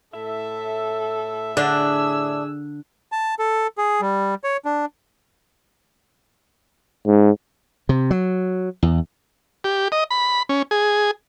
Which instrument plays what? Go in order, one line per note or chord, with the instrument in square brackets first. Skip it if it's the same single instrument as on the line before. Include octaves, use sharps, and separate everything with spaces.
[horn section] A2 E5 [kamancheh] A4
[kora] D3 [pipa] D4 [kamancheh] G#4 E6
[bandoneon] A5
A4
G#4
G3
C#5
D4
[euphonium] G#2
[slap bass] C3
F#3
E2
[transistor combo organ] G4
D#5
B5
C#4
G#4